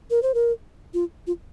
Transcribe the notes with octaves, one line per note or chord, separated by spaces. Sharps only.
A#4
C5
A#4
F4
F4